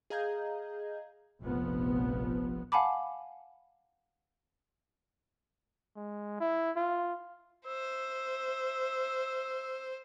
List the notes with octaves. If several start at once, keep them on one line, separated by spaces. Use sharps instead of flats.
G#4 D#5 F5 A#5 G6 G#6
F1 A#1 F3 B3
F5 F#5 G#5 A5 B5 D6
G#3
E4
F4
C5 E5